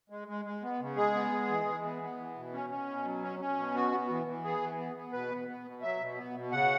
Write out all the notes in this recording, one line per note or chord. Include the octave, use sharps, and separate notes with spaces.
G#3
G#3
G#3
B3
C#3
G#3 G#4
B3
G#3
E3
E3
B3
B3
E3
B2
C#4
C#4
B2
F#3
C#4
C#4
B2
B3 F#4
B3
E3
E3
B3 G#4
E3
B3
B3
B2 B4
B3
B3
B2
F#3 E5
B2
B3
B2
C#3 F#5